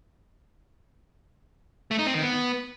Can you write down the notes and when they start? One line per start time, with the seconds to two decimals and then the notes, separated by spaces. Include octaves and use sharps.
1.91 A3
1.99 D#4
2.07 C4
2.14 D#3
2.22 B3